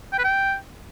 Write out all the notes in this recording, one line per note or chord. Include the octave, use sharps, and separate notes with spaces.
G5
B4
G5